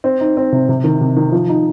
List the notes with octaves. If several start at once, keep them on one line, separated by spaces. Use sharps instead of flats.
C4
D#4
C4
C3
C3
D#3
C3
D#3
F3
D#4